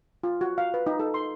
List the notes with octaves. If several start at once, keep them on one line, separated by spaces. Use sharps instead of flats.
F4
F#4
F5
B4
D#4
A4
C6